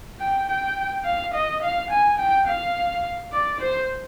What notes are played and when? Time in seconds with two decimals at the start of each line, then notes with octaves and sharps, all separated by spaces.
0.20 G5
0.48 G5
1.05 F5
1.34 D#5
1.62 F5
1.90 G#5
2.18 G5
2.47 F5
3.32 D5
3.60 C5